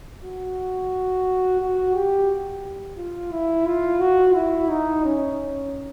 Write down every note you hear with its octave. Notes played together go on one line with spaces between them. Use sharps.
F#4
F#4
G4
F4
E4
F4
F#4
E4
D#4
C#4